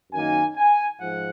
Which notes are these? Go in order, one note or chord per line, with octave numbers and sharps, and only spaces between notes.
F#2 D#3 A#3 D#4 G#5
G#5
G#2 F3 F#5